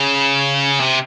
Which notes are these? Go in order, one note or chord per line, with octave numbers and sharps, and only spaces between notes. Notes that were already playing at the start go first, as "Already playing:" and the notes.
Already playing: C#3
C3